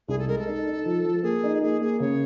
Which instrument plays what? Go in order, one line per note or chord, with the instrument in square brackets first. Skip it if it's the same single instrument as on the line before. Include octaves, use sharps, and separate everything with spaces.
[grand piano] C2 [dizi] G#4
[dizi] A4
[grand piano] G#3 [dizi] A#4
[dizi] A4
[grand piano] D#4
D#4
F3
F3
[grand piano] A#3 [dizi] G#4
[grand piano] D#4
[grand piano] A#3 [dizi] G#4
[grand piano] A#3 [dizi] G#4
[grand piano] C#3 [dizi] C#5